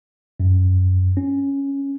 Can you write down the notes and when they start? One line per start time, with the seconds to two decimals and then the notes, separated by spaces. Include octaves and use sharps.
0.40 F#2
1.17 C#4